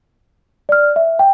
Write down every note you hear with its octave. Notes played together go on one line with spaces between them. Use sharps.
D5 F6
E5
G5